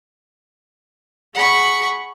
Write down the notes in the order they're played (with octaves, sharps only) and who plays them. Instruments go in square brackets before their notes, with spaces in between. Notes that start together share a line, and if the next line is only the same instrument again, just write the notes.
[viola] G#4 B5 [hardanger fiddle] F#5 C#6